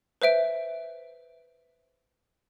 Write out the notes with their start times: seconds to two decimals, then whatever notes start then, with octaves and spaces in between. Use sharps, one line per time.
0.22 B4 C5 E5 D7